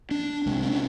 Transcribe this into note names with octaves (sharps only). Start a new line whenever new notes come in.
D4
C2 C3 G#3
D4
C#4